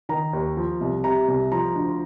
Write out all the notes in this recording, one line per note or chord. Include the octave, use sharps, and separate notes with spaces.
D#3 A#5
D#2
F3
C2
C3 A#5
C2
F3 A#5
D2